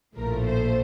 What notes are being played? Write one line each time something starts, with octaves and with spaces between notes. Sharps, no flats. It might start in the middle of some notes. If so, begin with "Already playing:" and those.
A#1 A2 F3 A3 A#4
C5